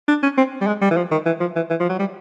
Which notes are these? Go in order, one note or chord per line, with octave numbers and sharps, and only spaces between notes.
D4
C#4
C4
G3
G#3
G3
E3
F3
D#3
E3
F3
E3
E3
F3
F#3
G3